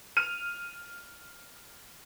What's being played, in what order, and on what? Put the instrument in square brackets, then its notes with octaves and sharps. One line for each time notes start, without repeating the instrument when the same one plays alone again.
[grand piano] F6 D#7